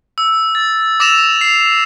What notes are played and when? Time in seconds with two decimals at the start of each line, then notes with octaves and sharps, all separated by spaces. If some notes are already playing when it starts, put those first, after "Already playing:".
0.18 E6
0.55 A6
1.00 D6 E6 A#6 E7 F7
1.41 C7 F7